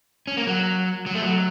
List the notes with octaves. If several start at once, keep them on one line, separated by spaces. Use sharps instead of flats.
C#4
A#3
F#3
F#3
A3
F#3